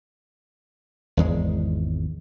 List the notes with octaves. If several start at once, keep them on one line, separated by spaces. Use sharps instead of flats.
G#1 E2 G#3